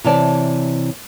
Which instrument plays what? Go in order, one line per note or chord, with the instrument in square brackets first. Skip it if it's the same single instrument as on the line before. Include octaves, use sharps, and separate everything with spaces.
[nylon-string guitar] C3 E3 C#5 D5 A5